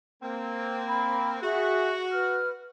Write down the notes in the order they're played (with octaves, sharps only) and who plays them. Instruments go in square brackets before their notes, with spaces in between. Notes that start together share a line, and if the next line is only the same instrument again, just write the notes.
[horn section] A#3 C4
[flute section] B5
[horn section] F#4 [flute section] G#4 E5 F#6
[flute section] B4 F6